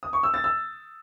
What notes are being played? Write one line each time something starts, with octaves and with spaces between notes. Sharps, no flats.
D#6
C#6
E6
A6
E6